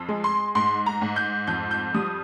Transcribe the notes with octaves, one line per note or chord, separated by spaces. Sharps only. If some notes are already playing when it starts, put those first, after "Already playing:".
Already playing: F2
G#3
C6
G#2 C6
A#5
G#2
G6
F2 G6
G6
G3 D#6